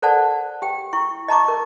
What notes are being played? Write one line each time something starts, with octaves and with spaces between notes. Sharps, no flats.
A4 A#4 C5 D5 F#5 A5
G4 G5
E4 C#6
D#5 A5 A#5 C#6 D6
A#4